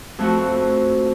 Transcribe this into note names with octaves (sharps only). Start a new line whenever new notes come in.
F2 A3 F#4